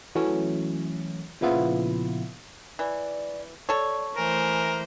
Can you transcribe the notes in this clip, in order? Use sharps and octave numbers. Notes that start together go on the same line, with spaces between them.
E3 F#3 A3 C#4
A#2 C#3 F3 B3 E4 F4
E3 D5
A4 C#5 D5
E3 A3 A#4 C5 G#5